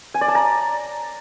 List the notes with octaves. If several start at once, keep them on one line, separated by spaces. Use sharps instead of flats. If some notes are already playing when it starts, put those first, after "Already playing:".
G#5
D5
A5
A#5